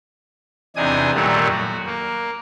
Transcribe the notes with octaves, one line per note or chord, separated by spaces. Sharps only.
E2 C3 D4 D#4 G#5 D#6
F#2 A#2 D#3 F#3 G3 A3
F#4
A#3